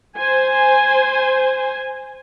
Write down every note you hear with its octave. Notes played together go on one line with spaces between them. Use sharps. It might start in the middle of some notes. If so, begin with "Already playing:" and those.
C5 G#5